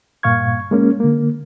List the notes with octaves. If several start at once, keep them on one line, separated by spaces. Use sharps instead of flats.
G2 A#2 F5 C#6 G#6
G#3 A#3 C#4
D3 A#3